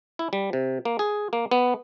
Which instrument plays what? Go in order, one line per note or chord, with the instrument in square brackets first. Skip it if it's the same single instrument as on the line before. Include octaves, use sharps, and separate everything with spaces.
[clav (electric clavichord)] E4
G3
C3
A#3
G#4
A#3
B3